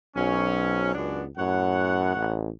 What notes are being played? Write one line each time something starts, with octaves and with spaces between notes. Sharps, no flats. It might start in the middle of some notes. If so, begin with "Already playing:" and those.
B1 F#3 C4 C#4
C#2 F#2 B3 D4
F#2 A2 C#5 F#5
A1